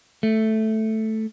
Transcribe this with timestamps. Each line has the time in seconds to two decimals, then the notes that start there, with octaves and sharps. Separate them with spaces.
0.23 A3